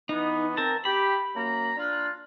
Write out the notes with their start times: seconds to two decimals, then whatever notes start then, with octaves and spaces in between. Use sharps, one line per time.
0.09 E3 B3 D#4
0.57 C4 A#4 A5
0.85 G4 B5
1.35 F#2 A#3 A#5
1.77 D4 F4